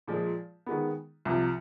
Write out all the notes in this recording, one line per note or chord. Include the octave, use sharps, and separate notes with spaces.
A#2 F3 G#3
D#3 G#3 B3
C2 C3 F3